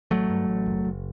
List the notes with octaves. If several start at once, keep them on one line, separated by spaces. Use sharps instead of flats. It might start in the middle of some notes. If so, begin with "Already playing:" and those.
A1 F#3 A3
G2
A1
F#1
F#1